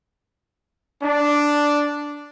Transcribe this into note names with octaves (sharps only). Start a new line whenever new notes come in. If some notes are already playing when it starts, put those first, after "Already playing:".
D4